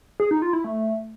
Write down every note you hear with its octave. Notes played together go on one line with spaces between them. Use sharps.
G#4
D#4
F4
E4
A3